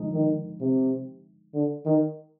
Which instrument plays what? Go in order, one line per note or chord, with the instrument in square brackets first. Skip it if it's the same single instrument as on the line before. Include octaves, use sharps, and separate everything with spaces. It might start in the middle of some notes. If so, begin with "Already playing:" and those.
Already playing: [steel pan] D3 F3 G#3 D#4
[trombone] D#3
C3
D3
D#3